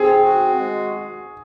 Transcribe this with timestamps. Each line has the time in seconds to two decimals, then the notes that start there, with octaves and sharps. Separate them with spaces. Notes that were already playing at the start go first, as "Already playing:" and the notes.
Already playing: C4 G#4
0.24 F#4
0.58 G#3